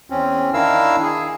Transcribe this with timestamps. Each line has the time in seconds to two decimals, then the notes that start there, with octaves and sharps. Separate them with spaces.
0.10 E2 C4 C#4
0.54 D#3 D4 E4 A#4 F5 E6
1.03 G#4